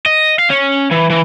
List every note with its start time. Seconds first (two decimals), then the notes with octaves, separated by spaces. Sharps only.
0.06 D#5
0.39 F5
0.50 C#4
0.91 E3
1.10 E3